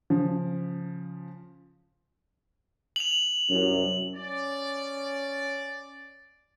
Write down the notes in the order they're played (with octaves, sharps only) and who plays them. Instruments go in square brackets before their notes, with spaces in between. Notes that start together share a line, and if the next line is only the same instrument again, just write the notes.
[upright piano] C#3 F3
[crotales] F7 F#7
[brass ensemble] C2 F#2
[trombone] C#4 [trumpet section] D5